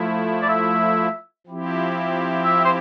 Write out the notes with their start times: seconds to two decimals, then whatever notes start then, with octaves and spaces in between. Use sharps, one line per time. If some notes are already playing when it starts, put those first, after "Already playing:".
Already playing: F3 A3 E4
0.42 D5
0.49 E5
1.47 F3 C4 E4 G4
2.45 E5
2.65 C5